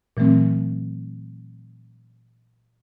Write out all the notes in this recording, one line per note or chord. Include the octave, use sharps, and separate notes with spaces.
A#2 E3 F#3 A3 C4